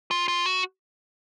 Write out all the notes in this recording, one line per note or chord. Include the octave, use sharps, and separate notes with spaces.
F4
F4
F#4